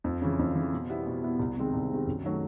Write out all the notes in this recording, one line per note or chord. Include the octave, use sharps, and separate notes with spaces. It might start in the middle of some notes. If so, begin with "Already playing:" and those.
F2
C#3 E3
F2
C#3 E3
B2
G3 B3 E4
B2
G3 B3 E4
C2
C3 D#3 G#3 C4
C2
C3 D#3 G#3 C4
F#2
D#3 F#3 A3